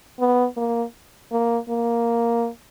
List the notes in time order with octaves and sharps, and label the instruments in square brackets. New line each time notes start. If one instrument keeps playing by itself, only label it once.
[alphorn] B3
A#3
A#3
A#3